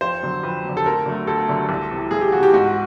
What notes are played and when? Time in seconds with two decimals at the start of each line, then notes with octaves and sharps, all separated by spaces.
0.01 F2 C5
0.23 D3 F#3
0.43 F2 B4
0.65 D3 F#3
0.77 A4
0.85 D2 A#4
1.06 D3 F#3 A3
1.27 D2 A4
1.48 D3 F#3 A3
1.69 C2
1.90 C3 E3
2.11 C2 G#4
2.21 G4
2.32 C3 E3 F#4
2.43 G4
2.53 G#2 F#4